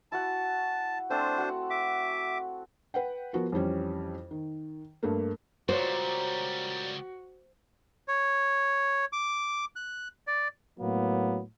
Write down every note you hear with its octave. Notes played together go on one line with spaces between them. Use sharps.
E4 F#4 F#5 A5
A3 C4 D4 C5 A5
F#4 F#5
E5 D6
B4 F#5 G5
F3 B3 F#4 A#4
F2 E3 G3 C#4
D#3
G2 A3 A#3
C#2 A#2 G3 F4 F#4 C5 C#5
C#5
D6
F#6
D5
A2 F#3 A#3 B3